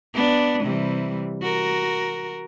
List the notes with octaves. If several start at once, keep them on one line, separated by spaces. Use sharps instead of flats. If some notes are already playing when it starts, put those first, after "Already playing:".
B3 D4
C3 E3 G3
F#4 A#4